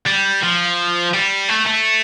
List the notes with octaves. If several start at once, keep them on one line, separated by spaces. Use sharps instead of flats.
G3
F3
G3
A3
A3